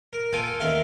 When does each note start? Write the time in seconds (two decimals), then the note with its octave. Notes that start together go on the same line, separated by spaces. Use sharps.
0.13 A#4
0.33 A#3 F4 A4 G5 G#5
0.60 A1 D#2 A#4 E5 F5 C6